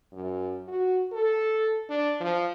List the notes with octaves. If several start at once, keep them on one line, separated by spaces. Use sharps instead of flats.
F#2
F#4
A4
D4
F3